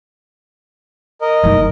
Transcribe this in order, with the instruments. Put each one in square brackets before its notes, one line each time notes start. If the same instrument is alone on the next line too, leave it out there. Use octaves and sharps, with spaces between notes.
[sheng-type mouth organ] A#4 D#5
[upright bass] F#1 D#3